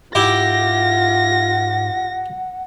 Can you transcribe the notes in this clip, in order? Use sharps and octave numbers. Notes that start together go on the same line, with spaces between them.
G#2 E4 F4 G4 F#5 A#6